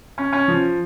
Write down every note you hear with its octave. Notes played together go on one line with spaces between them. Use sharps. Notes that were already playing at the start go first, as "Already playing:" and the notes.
C#4
C#4
F3